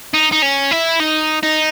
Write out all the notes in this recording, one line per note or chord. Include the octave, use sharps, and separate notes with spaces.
D#4
D#4
C#4
E4
D#4
D#4